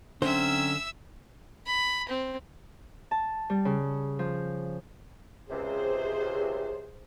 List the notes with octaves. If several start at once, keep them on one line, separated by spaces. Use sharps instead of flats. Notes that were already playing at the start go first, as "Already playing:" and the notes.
D3 F#3 C4 C#4 C5 E5 E6
B5
C4
A5
G3
C#3
F3
C#2 C3 G#4 C5